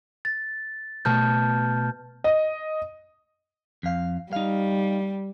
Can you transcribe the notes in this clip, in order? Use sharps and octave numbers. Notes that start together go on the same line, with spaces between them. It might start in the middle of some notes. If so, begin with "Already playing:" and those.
A6
B2 A3 A5 F6 G6
D#5
F2 F5
G3 D#4 F5